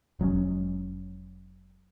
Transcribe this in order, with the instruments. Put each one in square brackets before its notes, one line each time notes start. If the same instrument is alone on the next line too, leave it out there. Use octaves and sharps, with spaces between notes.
[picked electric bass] F1 F#3 G#3 C#4